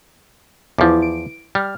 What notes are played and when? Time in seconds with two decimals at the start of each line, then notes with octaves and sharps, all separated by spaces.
0.79 E2 F3 E4 B4 D6
1.02 D7
1.55 G3 F6